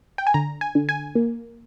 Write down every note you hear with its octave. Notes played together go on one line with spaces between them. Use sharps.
G5
G#5
D3 A#5
G#5
D3
G#5
A#3